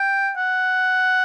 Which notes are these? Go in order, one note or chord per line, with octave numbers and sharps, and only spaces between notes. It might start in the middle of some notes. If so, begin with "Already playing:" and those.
Already playing: G5
F#5